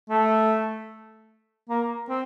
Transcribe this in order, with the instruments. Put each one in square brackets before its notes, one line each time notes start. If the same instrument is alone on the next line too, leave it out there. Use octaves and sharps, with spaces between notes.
[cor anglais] A3
A#3
C4